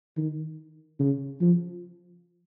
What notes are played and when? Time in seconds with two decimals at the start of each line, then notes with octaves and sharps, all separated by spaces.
0.17 D#3
0.99 C#3
1.41 F3